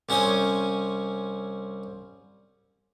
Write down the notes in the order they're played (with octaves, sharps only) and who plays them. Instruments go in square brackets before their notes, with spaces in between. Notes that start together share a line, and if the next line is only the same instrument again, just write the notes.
[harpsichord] C2 C#4 C5 G#5 D#6